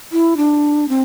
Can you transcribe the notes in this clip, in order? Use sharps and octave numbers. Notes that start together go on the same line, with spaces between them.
E4
D4
C4